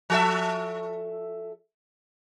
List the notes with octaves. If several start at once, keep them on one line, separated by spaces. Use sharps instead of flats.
F3 A4 E5